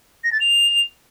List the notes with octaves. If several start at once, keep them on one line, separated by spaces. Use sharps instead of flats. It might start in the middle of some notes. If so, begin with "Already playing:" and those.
A#6
A6
F7